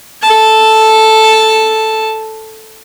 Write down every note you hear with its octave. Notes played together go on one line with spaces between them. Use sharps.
A4 A5